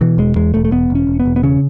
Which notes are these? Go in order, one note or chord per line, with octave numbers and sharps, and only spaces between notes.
B2 E3
E1 G#3
E2 G#3
E1 A3
A3
E1 B3
E1
C#4
E1
B3
E1
B3
C#3 C#4